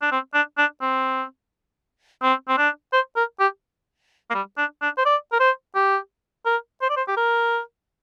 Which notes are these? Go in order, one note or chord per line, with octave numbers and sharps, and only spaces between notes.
D4
C4
D4
D4
C4
C4
C4
D4
C5
A#4
G4
A#3
G3
D4
D4
C5
D5
A#4
C5
G4
A#4
C5
D5
C5
G4
A#4